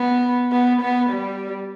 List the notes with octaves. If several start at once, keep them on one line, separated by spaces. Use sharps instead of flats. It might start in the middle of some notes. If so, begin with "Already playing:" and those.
Already playing: B3
B3
B3
G3